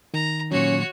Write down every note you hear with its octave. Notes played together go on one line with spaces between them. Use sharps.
D#3 A#5
A#2 F#3 C#4 F#4 C#5